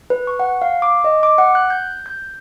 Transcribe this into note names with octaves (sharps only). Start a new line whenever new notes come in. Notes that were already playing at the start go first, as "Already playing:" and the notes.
B4
C#6
F#5
F5
D6
D#5
D6
F#5
F#6
G6
G6